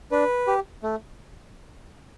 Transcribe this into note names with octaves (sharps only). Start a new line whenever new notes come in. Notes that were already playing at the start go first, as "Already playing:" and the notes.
D4 B4
G4
A3